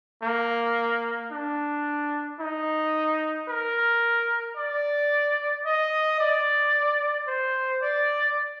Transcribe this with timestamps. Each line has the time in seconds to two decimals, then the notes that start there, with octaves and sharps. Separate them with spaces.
0.23 A#3
1.32 D4
2.40 D#4
3.49 A#4
4.57 D5
5.66 D#5
6.19 D5
7.27 C5
7.82 D5